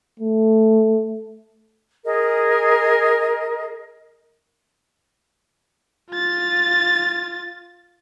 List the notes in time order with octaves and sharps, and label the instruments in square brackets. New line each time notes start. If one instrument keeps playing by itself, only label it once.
[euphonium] A3
[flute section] G#4 A#4 D#5
[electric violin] F4 A6